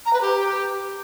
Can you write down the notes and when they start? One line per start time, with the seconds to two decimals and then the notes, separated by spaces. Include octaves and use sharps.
0.05 A#5
0.13 B4
0.20 G4